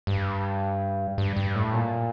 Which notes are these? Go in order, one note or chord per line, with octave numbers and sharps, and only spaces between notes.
G2
G2
G2
A2
A#2